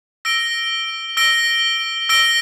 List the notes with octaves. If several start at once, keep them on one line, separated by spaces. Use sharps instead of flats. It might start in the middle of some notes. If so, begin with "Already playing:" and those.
E6 A#6 D7 G7
E6 A#6 D7 G7
E6 A#6 D7 G7